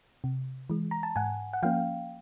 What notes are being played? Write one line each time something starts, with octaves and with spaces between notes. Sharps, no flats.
C3
E3 G#3
A#5
A5
G#2 F#5 G#5
F#5
F3 A#3 C#4 F5 G5